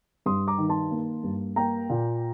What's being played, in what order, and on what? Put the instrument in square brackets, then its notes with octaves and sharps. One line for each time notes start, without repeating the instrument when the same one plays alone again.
[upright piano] G2 C6 D#6
A#5 D6
D#3
A5 C6
A#3
G2
A#3 G5 A#5
A#2